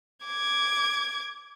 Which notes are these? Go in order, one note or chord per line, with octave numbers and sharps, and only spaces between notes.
D6 G#6